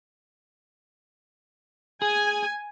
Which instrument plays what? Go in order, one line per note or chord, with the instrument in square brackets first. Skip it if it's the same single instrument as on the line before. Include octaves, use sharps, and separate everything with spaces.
[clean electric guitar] G#4 [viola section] G#5